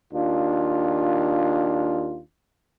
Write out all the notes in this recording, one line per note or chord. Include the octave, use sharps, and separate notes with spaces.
D#2 D4 F4